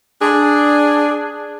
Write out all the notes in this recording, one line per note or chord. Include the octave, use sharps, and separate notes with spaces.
D4 G#4